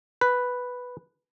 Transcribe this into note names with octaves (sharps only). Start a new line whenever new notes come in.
B4